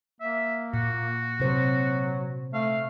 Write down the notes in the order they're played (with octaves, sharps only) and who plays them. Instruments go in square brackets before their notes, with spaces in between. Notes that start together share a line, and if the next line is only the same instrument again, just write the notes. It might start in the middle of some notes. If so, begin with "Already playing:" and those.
[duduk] A#3 [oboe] E5
[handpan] A#2 [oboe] F#4
[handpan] C3 C5 [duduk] F#3
[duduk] A3 [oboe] F5